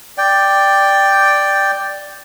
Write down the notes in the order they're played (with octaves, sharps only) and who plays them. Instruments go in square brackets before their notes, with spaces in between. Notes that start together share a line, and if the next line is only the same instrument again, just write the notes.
[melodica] D5 G5